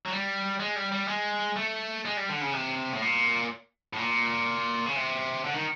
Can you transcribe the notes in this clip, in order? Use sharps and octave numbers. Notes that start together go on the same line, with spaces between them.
F#3
G3
G#3
G3
G3
G#3
A3
G#3
G3
D3
C#3
C3
A2
A#2
A2
A#2
C#3
C3
D3
D#3